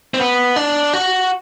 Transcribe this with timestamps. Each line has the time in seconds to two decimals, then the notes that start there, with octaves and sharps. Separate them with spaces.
0.14 C4
0.20 B3
0.56 D4
0.93 F#4